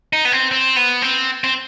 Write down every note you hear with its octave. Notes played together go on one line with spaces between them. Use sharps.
D#4
B3
C4
C4
B3
C4
C4